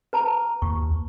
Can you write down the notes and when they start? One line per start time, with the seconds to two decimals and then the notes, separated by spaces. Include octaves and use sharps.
0.13 B4 A5 A#5
0.62 D#2 C#6